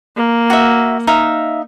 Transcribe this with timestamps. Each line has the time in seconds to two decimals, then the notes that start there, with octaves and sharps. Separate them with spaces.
0.16 A#3
0.50 F#4 E5
1.07 D#4 E5 F5